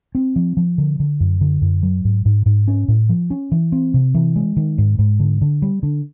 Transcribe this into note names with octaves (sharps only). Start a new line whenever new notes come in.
C4
F3
F3
D3
D3
F#2
D3
F#2
F#3
G#2
G#2
G#2
C#4
A2
F3
C#4
E3
C4
C3
E3
G#3
D#3
G#2
G#2
D3
D3
G3
D3